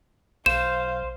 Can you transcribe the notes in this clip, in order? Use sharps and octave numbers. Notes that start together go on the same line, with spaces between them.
B1 C5 F5 E7